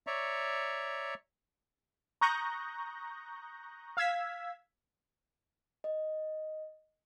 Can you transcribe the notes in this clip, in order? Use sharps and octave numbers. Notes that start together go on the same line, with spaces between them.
C#5 D5 E5 A#5 C#6
A#5 C#6 D#6 F#6 G6 A#6
F5 E6 G#6 B6
D#5